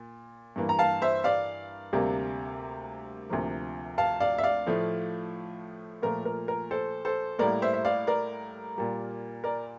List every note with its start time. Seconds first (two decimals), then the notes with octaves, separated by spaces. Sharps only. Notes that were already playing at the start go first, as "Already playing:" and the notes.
Already playing: A#2
0.56 G2 E3 A#3
0.69 A#5
0.79 F5 A5
1.02 C5 E5
1.24 D5 F5
1.93 D2 C3 G3 A#3
3.29 D2 C3 F3 A#3
3.98 F5 A5
4.20 D5 F5
4.38 E5
4.43 D5 F5
4.66 A2 F3 A3
6.02 A#2 F3 A3 A#4
6.25 A#4
6.48 A#4
6.71 A4 C5
7.05 A4 C5
7.39 A2 G3 A#3 A#4 D5
7.62 C5 E5
7.74 E5
7.85 D5 F5
8.07 A#4 D5
8.76 A#2 G3 A#3
9.44 A#4 D5